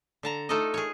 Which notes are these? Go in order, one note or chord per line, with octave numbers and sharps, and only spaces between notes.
D3 A5 A#5
A3 D#4 F4 A4 D5 D#5
G#4 A#4 C#5